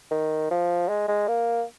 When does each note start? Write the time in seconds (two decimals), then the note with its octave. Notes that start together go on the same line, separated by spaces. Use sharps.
0.11 D#3
0.51 F3
0.89 G#3
1.08 G#3
1.28 A#3